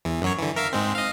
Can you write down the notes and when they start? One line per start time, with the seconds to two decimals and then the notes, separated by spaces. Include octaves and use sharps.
0.05 E2 E3
0.22 F#2 F#3 C#5
0.38 D3 E3
0.56 A#4 E5 F5
0.73 G#2 G#3 C4
0.95 D#5 F5